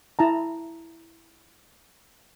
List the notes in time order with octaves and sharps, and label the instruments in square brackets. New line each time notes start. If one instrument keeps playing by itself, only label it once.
[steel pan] E4 A5 A#5